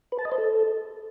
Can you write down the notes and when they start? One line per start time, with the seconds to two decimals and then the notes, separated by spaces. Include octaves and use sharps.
0.12 B4
0.19 A5
0.25 D#5
0.32 C5
0.38 A4